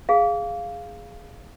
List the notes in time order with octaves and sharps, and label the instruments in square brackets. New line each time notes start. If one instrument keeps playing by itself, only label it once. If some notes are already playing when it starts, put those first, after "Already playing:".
[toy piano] G#4 F5